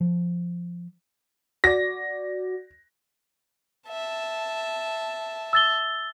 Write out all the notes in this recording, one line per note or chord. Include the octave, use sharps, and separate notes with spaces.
F3
F#4 D5 A#6
E5 A5
E6 A6 G7